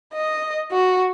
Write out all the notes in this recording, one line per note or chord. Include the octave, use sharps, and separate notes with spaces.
D#5
F#4